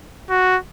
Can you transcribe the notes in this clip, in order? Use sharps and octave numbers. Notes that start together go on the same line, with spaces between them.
F#4